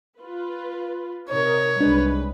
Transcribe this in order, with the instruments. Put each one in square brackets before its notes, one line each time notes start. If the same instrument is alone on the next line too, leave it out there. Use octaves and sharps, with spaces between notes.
[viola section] F4 B4
[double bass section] C3 [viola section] D#4 A#4 [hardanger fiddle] C#5
[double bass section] C2 G#3 [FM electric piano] D4 [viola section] B4